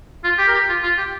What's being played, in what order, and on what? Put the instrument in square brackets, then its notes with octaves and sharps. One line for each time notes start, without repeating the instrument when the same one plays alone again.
[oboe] F4
G4
A#4
G4
F4
F4
G4